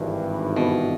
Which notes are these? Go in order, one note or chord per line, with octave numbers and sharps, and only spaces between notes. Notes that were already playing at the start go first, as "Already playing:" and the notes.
Already playing: G#1 G2 E3
B2